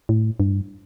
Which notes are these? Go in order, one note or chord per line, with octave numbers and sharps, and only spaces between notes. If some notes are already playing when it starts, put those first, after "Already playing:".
A2
G2